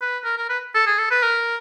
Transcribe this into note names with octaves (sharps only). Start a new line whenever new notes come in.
B4
A#4
A#4
B4
A4
G#4
A4
B4
A#4